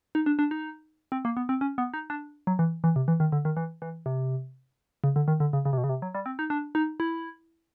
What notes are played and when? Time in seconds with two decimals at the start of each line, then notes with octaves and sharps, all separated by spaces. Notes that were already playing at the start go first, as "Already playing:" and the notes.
0.15 D#4
0.26 D4
0.39 D4
0.51 D#4
1.12 C4
1.25 A#3
1.37 B3
1.49 C4
1.61 C#4
1.78 B3
1.94 D#4
2.10 D4
2.47 F#3
2.59 E3
2.84 E3
2.96 C3
3.08 E3
3.20 D#3
3.32 D3
3.45 D#3
3.57 E3
3.82 E3
4.06 C3
5.04 C#3
5.16 D3
5.28 D#3
5.40 D3
5.53 C#3
5.65 C#3
5.73 C3
5.78 B2
5.84 C#3
5.89 C3
6.02 F#3
6.15 G3
6.26 C4
6.39 D#4
6.50 D4
6.75 D#4
7.00 E4